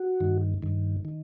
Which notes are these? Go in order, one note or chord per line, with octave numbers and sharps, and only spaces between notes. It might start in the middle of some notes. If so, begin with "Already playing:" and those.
Already playing: F#4
G2 D#3
G2 D#3
D#3